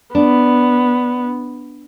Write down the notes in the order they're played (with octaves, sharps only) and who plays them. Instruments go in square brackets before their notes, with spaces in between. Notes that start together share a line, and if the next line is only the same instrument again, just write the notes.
[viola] B3 [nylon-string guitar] D4